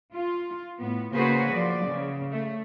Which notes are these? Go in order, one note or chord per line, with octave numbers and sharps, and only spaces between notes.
F4
A2 B3
C#3 A#3 F#4 G#4 B4 C5
F3 D5
C#3
A3